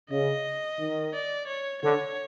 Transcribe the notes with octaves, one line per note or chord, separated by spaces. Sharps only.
C#3 D#5
D#3
D5
C#5
D3 C#5